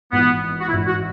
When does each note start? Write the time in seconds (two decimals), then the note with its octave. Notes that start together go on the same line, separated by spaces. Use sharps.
0.12 G#1 G#2 E3 B3
0.61 F#4
0.68 G#1 G#2 E3 E4
0.87 F#4